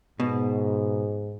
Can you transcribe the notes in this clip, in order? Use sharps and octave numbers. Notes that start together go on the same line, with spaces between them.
G#2 B2